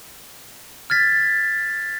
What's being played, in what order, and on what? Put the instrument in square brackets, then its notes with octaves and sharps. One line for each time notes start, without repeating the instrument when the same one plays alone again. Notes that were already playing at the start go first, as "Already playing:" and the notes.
[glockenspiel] F6 G#6 A6 B6